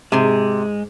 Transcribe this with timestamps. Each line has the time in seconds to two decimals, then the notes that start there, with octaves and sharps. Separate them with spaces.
0.12 G#2 C3 G#3 C6